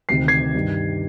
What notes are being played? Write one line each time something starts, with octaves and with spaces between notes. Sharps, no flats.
D2 C3 D#3 C7
G#6 C7
G2 D#3 G3